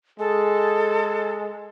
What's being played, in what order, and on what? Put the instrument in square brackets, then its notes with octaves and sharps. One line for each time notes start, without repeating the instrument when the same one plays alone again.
[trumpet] G#3 [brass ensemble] G#4 [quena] A4